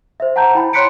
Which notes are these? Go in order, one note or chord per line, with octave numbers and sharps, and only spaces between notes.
C5 E5
F#5 A5 A#5 G6
E4 G5 A5 B5
C#5 C6 F#6 B6 C#7 D7